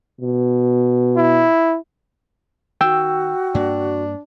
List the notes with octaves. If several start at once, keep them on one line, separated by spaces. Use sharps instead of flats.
B2
E4
D#3 F#4 G5 E6
G2 A#3 D4